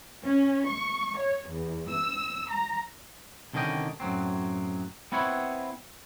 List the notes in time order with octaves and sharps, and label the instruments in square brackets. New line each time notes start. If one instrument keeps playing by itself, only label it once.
[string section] C#4
C#6
C#5
E2
E6
A#5
[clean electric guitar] C2 D3 D#3 C#4 D#5 G5
F#2 A2 F#3 C4
B3 C4 E4 B4 C#5